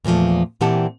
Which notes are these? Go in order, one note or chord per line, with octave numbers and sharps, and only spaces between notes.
E2 A#2 E3 F3 A3
A#2 E3 C4 G4 F#5 A5